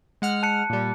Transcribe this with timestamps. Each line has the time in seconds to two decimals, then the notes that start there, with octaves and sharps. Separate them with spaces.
0.22 G#3 F#5 F6
0.43 A5 F#6 C#7
0.70 A#2 G3